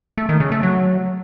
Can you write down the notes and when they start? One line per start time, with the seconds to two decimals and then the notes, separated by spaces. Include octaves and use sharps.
0.18 A3
0.29 D#3
0.40 C#3
0.52 A3
0.63 F#3